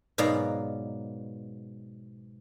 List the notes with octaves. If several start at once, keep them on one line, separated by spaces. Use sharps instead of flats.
G#2 B2 F#3 D5 F5 A#5